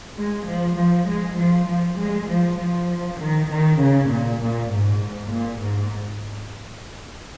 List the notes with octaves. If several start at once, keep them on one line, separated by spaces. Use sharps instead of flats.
G#3
F3
F3
G#3
F3
F3
G#3
F3
F3
D#3
D#3
C#3
A#2
A#2
G#2
A#2
G#2